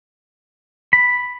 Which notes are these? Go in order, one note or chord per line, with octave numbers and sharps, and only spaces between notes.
B5